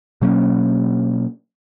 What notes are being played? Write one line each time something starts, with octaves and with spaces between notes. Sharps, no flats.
B2 F#3 A#3 C#4